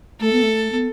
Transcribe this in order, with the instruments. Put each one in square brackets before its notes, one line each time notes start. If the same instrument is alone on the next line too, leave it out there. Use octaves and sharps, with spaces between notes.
[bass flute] A3 [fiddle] A4
[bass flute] B3
A3
B3